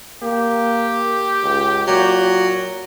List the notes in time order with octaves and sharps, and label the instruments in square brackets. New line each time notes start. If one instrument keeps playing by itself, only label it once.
[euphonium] A#3 [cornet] G4
[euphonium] C#2
[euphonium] A#2 [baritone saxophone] F#3